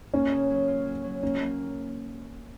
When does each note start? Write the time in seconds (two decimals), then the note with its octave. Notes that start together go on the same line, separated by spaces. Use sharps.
0.14 A#3 C#4
0.32 C#3
0.50 F#3
0.67 F4
0.86 F#3
1.04 F#3
1.23 A#3 C#4
1.41 A#3